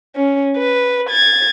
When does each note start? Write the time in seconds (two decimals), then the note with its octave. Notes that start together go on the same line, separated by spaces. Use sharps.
0.16 C#4
0.57 B4
1.10 G#6 A6